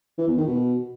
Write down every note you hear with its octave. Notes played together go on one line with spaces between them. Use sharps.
E3
E2
D#3
B2